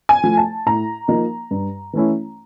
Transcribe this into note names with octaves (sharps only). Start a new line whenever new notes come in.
G#5
F3 A3
A5
A2 A#5
F3 A#3 D#4
G2
E3 A3 C#4 E4